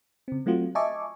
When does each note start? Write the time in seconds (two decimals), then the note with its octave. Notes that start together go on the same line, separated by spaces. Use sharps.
0.28 C#3 C4
0.46 F#3 A3 C4 F4 F#4
0.75 D#5 E5 G#5 A5 C#6 D6